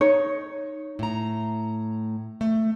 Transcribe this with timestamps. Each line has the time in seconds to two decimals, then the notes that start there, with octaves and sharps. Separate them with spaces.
0.01 D#4 C#5
0.99 A2 A#5
2.41 A3